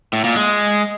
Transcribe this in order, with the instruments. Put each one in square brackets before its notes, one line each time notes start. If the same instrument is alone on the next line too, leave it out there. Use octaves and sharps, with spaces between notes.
[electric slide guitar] A2
A#2
G#3